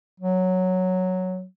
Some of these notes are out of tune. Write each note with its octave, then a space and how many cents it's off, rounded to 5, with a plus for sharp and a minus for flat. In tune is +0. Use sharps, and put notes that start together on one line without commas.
F#3 -5